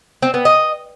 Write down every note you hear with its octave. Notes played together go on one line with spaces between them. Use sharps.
C4
B3
D#5